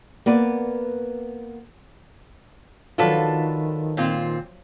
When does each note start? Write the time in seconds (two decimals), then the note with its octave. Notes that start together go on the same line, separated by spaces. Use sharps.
0.26 A#3 B3 B4 D5
2.98 D#3 F3 F#3 D4 F4 A4 B4
3.97 A#2 C4 F4